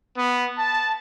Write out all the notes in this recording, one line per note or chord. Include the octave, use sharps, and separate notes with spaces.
B3
A5